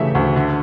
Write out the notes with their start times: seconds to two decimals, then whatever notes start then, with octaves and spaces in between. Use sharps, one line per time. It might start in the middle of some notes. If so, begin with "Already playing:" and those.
Already playing: C#3 E3 A3 G4 E5
0.15 D2
0.36 D3